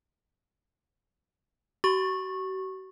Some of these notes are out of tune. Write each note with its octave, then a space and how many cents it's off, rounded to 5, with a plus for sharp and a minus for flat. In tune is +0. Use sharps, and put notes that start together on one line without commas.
F#4 +45 C#6 -15